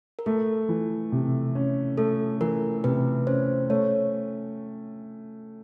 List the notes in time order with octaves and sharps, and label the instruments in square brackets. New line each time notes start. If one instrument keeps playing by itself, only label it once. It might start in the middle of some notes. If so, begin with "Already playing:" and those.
[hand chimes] A#4
[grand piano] A3 [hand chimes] A4
[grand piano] E3
C3
C#4
[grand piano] A3 [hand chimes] A4
[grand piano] E3 [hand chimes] A#4
[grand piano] C3 [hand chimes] B4
[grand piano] C#4 [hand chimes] C5
[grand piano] A3 [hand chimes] C#5